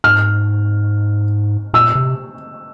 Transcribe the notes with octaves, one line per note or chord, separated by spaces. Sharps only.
G#2 F6
A#2 E6
C3